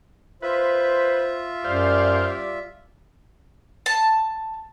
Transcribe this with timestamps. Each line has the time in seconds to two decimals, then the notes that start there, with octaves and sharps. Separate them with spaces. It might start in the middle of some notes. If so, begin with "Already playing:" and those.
0.42 F4 B4 C5 E5
1.64 F#2 G3 C5 D5 F5
3.86 A5